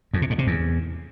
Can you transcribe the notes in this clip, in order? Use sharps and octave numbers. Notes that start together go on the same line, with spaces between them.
F2
C3
G#2
C3
E2